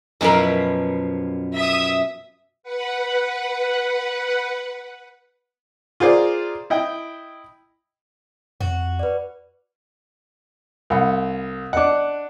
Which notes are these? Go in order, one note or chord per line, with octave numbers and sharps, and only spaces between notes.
F#2 B2 F3 B3 E4 A#4
E5 D#6
B4 F#5
F4 G#4 A#4 C5 D5
E4 D#5 G5
F2 F#4
B4 D5
C2 F5 F#5 B5
D4 D#5 F#5 D6